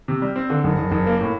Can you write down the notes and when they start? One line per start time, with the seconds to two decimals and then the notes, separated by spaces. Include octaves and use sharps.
0.08 C3
0.22 G3
0.36 C4
0.50 D3
0.64 F#1
0.78 F#1
0.92 F#1
1.07 A#3
1.21 A2